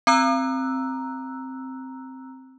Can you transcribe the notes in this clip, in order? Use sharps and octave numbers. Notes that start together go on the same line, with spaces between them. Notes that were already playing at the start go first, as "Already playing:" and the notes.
C4 A#5 E6 F#6